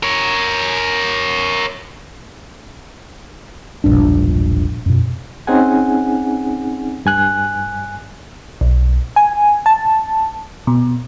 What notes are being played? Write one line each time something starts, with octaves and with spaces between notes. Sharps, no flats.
A#4 C#5
E1 A#1 G2 D4
F#2 B2
C4 C#4 D#4 G#4 F#5 G#5
G2 G#5 F#6
B1
G#5
A5
B2